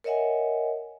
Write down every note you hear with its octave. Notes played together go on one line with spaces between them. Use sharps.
A#4 C#5 D#5 E5 F#5 G#5